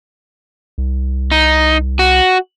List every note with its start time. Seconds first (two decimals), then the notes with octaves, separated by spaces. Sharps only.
0.78 C2
1.32 D#4
1.99 F#4